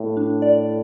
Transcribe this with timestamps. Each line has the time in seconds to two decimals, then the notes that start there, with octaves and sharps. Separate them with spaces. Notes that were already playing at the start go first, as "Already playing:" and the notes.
Already playing: A2
0.17 D4
0.42 D5